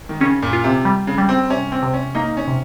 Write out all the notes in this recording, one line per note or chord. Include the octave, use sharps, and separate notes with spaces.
D#3
C#3 C#4
A#2
F4
C3
G3
C#3
G3
C4
C3 C#4
C4
C3
C#4
A#3 D#4
C#4
C3